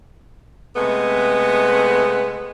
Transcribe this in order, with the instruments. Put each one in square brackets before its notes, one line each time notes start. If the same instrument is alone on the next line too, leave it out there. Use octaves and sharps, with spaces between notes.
[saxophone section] C3 G#3 A3 B3